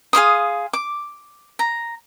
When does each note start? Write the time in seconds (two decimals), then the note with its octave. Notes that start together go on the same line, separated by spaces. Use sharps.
0.13 G#4 F5 C6 D#6
0.73 D6
1.59 A#5